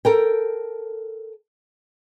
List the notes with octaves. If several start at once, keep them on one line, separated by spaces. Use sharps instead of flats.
A4 A#4 G5